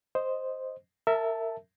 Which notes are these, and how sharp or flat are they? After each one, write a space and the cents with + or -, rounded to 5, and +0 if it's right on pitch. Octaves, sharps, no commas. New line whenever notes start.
C5 +0 D#5 +0
A#4 -30 E5 +0 A5 +0